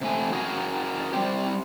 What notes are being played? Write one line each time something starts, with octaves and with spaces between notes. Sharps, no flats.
C3 A3 G#5
F#4 G#4 A#4 E5 G#5
G3 G#3 C4 G4